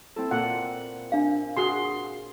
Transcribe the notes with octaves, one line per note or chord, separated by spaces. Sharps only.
C4 E4 A4
A#2 F#5
D4 F5
F#4 G#4 C6